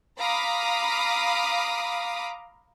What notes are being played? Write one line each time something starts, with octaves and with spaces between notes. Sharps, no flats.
F5 A#5 B5 D6 D#6 B6